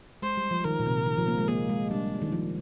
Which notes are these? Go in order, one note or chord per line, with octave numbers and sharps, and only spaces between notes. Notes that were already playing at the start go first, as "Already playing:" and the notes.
G#3 C5
G3
F3
D#3 A#4
A#2
C3
D#3
F3
A#3
G#3
A#3 G#4
G#3
G3 D4
D#3
F3